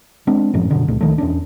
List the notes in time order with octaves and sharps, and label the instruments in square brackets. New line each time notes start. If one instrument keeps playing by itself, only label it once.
[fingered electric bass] G#3 B3 C4 D4
F#2 A2 F3 C#4
F#2 B2 D3
C#2 A#2 A3
C#2 D#3 F3 A3
E2 C#4 D4